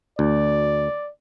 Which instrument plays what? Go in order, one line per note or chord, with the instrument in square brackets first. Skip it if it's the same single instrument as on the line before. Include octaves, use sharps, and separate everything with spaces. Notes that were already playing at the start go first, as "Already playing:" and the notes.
[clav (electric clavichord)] D2 [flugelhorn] D5